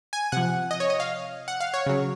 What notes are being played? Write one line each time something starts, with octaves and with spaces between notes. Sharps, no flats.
G#5
C3 F3 F#5
D#5
C#5
D#5
F5
F#5
F5
C#5
C#3 F#3